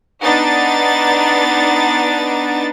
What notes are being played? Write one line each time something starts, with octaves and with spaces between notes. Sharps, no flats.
B3 D4 D#4 A6